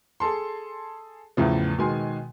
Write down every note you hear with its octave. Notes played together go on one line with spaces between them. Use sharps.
G#4 A4 A5 C6
E2 A2 C#3 F3
B2 D#3 G#3 G#5 C6